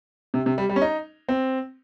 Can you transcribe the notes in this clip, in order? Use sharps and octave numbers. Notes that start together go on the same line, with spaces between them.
C3
C3
G3
G3
C#4
D#4
C4